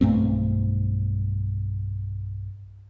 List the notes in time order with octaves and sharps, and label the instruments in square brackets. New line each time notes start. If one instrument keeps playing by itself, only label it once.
[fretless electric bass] B1 G2 A3 C4